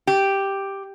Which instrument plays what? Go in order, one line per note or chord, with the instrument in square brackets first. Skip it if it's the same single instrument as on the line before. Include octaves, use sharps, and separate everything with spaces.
[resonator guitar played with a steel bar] G4